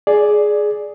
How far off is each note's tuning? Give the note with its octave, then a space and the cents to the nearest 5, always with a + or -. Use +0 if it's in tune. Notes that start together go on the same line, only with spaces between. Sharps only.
G#4 +10 D5 +0